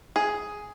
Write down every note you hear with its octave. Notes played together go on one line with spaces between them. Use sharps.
G#4